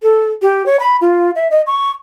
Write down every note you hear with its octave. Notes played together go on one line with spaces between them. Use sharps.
A4
G4
C#5
B5
F4
E5
D#5
C#6